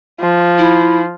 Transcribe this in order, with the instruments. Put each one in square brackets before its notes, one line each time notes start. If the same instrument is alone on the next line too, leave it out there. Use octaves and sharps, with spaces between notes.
[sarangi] F3
[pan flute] E4